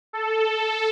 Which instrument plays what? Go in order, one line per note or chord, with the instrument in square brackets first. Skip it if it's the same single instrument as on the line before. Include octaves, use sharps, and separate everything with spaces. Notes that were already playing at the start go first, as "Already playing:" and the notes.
[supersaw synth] A4